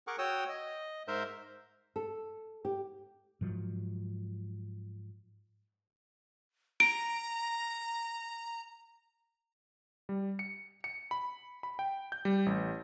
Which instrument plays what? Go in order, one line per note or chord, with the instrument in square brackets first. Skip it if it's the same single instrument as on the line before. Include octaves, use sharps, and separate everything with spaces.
[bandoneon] G#4 A#4 F#5 C#6 D6
F#4 C#5 G5 D#6 E6
D#5
G#2 A#4 C5 E5 G6
[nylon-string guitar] A4
G4
[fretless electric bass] G#2 F3 F#3
[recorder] A#5 [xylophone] D7
[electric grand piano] G3
C#7
C#7
B5
B5
G5
G6
G3
A1